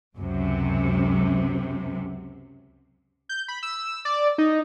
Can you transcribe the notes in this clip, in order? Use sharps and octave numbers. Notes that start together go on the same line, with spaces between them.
C#2 F#2 C3
G6
B5
E6
D5
D#4